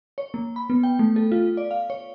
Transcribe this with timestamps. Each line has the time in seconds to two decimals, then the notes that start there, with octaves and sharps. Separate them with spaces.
0.18 C#5
0.34 A#3
0.56 B5
0.70 B3
0.83 G5
0.99 A3
1.16 A4
1.32 F4
1.57 D5
1.71 F5
1.90 C#5